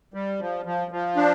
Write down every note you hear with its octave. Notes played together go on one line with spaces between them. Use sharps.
G3
F3
F3
F3
D4